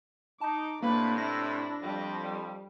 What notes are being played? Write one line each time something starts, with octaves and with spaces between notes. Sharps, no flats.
D#4 A5 D6
A2 C3 A#3 D4 B4
E4 A#6
F2 G3